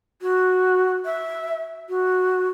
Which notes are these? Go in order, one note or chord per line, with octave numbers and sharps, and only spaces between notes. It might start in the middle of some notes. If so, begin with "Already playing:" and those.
F#4
E5
F#4